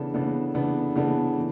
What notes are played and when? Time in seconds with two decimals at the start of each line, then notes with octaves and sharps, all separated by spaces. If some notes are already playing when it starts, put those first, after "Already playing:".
Already playing: C#3 E3 B3 D4 A4
0.14 C#3 E3 B3 D4 A4
0.54 C#3 E3 B3 D4 A4
0.95 C#3 E3 B3 D4 A4
1.37 E3